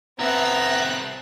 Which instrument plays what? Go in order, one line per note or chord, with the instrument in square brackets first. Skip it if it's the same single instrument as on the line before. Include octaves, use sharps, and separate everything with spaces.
[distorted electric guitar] C2 A4 [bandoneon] B3 A#5 [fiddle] C4 F#6 [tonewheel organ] E5